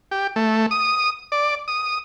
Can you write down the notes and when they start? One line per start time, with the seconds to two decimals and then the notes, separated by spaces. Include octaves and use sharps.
0.11 G4
0.36 A3
0.71 D#6
1.32 D5
1.68 D#6